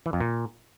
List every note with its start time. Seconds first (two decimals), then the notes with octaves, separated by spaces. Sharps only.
0.06 E3
0.13 F2
0.20 A#2